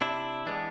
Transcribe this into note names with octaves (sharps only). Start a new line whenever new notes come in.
C3 D4 E4
E3 G#3 B3 D4